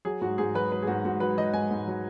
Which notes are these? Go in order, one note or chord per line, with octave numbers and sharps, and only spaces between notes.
F#3 G#4
G#2 F#4
G#2 G#4
F#3 B4
F#3 B4
G#4
G#2 F#4
G#2 F#4
F#3 B4
F#3 D#5
G#2 G#5
G#2
F#3